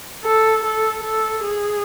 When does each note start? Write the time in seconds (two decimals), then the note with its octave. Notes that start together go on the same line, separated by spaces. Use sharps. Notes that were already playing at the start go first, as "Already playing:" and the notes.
0.24 A4
0.64 A4
1.03 A4
1.44 G#4